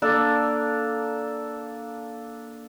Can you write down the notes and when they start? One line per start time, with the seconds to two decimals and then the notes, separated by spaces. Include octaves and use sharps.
0.02 A#3 D4 A4